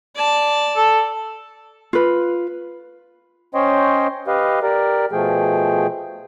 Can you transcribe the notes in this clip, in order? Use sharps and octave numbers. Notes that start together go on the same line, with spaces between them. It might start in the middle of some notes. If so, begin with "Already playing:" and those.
D5 A5
A4
F4 B4
C#4 C5 C#5 D#5 G5 C6
G4 B4 D#5 F5
G4 A#4 D5
B2 F3 A3 G#4 G5